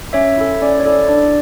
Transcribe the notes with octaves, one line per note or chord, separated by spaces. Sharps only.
C#4 C#5 E5
E4 A4
C#4 D5
C#5
E4 A4 D5
D4 D5